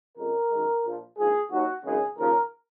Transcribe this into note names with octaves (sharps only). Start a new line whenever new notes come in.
F2 C#3 G#3 A#4
F#2 D#3 G#3
A#1 A#2 F3
A#1 G#2 F3 G#4
D#2 D#3 F#3 F#4
G#1 F#2 C#3 G#3 G#4
D#2 C#3 F3 A#4